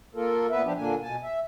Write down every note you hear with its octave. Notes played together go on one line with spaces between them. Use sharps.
A#3 F4 A4 A#4
A#2 B3 B4 E5
F3 D4 G4
A#2 D3 A#3 D4 G#5
B2 G#5 A5
E5